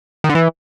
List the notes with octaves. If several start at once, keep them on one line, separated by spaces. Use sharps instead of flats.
D#3
D3
E3